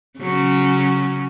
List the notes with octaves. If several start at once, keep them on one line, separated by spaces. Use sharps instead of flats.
C#3 F#3 C#4